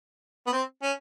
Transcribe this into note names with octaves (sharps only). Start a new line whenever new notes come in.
B3
C4
C#4